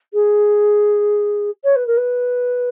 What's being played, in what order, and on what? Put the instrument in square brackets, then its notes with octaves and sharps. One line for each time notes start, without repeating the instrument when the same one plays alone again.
[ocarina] G#4
C#5
B4
A#4
B4